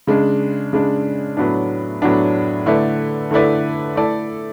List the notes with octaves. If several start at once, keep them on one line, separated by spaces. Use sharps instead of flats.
C#3 G#3 D4
C#3 G#3 D4
A2 F#3 B3 D4
A2 F#3 B3 D4
D3 A3 E4 B4 D5
D3 A3 E4 B4 D5
A3 E4 A4 D5